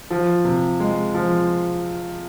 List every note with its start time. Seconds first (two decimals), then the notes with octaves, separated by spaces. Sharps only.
0.10 F3
0.44 C3
0.80 G#3
1.14 F3